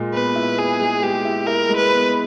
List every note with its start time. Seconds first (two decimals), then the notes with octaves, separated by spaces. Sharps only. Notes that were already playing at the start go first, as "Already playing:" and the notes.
Already playing: A#2 G#3
0.13 B3 B4
0.36 E4
0.59 B3 G#4
0.80 G#3
1.02 G#3 G4
1.25 E4
1.47 E4 A#4
1.69 G#3
1.76 B4
1.92 B3